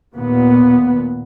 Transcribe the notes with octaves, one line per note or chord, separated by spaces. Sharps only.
D#2 A#2 B3